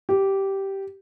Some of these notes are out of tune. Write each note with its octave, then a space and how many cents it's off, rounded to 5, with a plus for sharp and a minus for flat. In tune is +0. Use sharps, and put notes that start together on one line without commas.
G4 -10